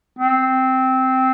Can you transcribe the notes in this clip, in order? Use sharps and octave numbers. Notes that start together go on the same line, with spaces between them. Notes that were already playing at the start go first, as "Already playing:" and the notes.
C4